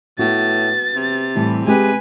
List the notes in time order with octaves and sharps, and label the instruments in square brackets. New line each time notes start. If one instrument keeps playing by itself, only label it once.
[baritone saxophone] A2 [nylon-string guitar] B3 F#4 [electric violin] A6
[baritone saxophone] C3
[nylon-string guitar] A2 E3 G3
[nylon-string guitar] G#3 C4 G4 [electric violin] B4 G#5